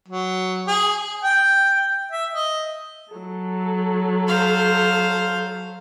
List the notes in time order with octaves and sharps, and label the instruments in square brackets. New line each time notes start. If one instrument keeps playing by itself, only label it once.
[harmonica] F#3
G#4
G#5
G5
E5
D#5
[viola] F#3 A4
[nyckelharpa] C5 F5